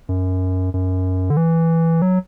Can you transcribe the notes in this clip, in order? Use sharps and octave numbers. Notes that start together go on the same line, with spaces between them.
F#2
F#2
D3
E3
F#3